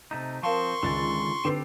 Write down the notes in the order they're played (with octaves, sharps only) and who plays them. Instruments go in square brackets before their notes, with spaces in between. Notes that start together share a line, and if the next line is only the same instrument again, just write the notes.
[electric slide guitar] C3 A3 D#4
[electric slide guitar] F3 C4 [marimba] A#4 F5 A5 [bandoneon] C6 C#6
[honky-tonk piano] C#2 A6 [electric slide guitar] D3 D#3 G#3
[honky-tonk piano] D3 B4 C7 [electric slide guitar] C4 G4 A4